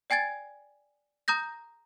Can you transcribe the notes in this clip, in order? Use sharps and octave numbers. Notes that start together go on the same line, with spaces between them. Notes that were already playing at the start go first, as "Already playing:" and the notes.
D5 G5 G#5 G#6 A6
A#5 D#6 G6 A#6